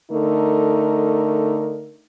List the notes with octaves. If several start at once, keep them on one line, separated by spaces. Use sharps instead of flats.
D3 A3 D#4 A#4